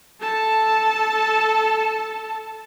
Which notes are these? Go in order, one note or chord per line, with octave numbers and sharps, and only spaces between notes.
A4 A5